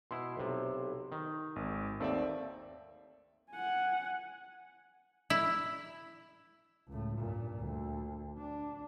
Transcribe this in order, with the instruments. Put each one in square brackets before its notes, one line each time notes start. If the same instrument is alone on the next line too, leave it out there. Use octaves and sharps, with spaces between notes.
[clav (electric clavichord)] B2 E4 [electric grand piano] C6
[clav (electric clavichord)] B1 C3
D#3
[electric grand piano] G#1
[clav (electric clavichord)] D#2 A3 [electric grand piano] C4 D5 E5
[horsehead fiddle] F#5 G#5
[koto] E4
[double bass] C#2 A2
G2 A#2
D2
D4